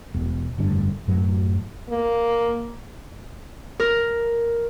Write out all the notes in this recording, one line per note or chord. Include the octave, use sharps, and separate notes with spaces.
E1
F1 G2 D3 D4
F#2 A2 F#3
A#3
A#4